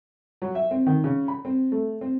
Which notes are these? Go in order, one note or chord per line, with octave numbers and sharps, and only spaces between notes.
F#3
E5
C4
D#3
C#3
B5
C4
A3
C4